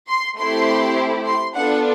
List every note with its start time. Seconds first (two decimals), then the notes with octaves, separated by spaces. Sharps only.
0.09 C6
0.38 A3 C4 E4 G4 C6
1.26 C6
1.55 B3 D4 F4 A4 F#5